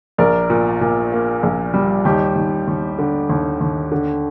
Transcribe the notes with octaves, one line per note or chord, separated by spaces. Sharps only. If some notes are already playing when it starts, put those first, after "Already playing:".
A#1 A#4 D5
A#2
A#2
A#3
A#1
G3
D#2 D#4 G4
D#2
D#2
D3
D#2
D#2
D3